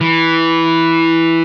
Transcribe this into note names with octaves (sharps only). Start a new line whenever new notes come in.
E3